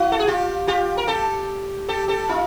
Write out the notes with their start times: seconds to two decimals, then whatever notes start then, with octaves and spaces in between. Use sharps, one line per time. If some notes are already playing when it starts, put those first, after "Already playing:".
Already playing: E4 F#4
0.12 A4
0.19 G#4
0.27 F4 G4
0.67 F4 G4
0.97 A#4
1.07 G4 A4
1.88 G4 A4
2.08 G4 A4
2.29 D#4 F4